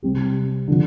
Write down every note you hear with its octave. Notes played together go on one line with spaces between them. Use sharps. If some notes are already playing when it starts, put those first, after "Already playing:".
C3 G3 C4 G4
D3 F3